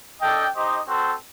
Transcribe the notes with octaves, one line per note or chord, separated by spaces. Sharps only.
D4 A4 D#5 G5
D#4 G4 C5 D#5
C4 F#4 A4 C5